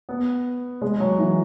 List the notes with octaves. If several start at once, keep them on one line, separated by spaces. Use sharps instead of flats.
B3
G#3
F#3
E3